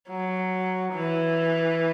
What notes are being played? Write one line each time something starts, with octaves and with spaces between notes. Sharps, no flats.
F#3
E3